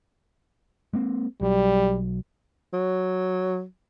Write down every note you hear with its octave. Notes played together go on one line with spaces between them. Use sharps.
G#3 A#3 C4
B1 F#3 G3
F#3